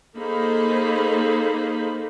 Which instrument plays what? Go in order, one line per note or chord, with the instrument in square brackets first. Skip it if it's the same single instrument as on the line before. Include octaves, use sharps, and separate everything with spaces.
[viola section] A#3 D#4 G#4 A4 C5 B5